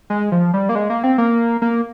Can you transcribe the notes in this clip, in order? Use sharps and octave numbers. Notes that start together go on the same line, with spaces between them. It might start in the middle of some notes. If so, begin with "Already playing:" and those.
G#3
F3
G3
A#3
G#3
A#3
C4
A#3
A#3